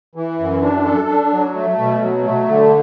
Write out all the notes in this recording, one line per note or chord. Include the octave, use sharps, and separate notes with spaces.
E3
F#2
D4
A4
D4
F#3
A3
B2
F#3
A3
D3